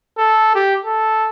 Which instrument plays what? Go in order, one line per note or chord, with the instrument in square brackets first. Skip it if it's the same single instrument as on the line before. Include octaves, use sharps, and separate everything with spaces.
[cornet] A4
G4
A4